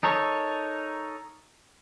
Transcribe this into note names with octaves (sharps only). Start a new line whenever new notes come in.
D#4 A4 A#4 C#5